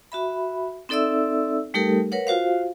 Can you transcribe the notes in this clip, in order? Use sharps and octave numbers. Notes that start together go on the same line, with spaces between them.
F#4 E5 B5
C4 D#4 A4 D5 E5 E6
G3 A3 D#4 G4 A4 A#4
A#4 B4 C#5 F#5
F4 F#4 C5 F5